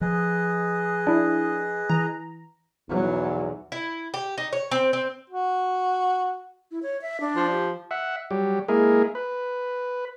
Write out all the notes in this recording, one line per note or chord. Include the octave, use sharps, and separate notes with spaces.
F3 G#4 B4 D#5
D4 E4
E3 A#5
B1 E2 F#3
E4
G4
D#4
C#5
C4
C4
F#4
E4
C#5
E5
D4
F3
G4
E5 F#5
F#3 G3 G4
G#3 A#3 E4 G#4 A#4
B4